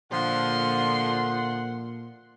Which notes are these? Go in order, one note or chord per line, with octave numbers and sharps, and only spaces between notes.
A#2 D3 F3 F#5 C6